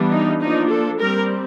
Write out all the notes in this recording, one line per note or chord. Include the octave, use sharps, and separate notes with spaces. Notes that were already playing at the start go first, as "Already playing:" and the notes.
Already playing: E3 G3 B3 D4
D#4
F3 A#3 D4 D#4
A4
G3 C4 A#4